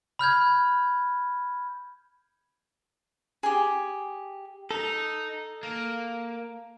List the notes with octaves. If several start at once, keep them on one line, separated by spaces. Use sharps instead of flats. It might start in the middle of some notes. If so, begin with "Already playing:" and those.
B5 F6 G6 G#6
G4 G#4
D#4 A4
A#3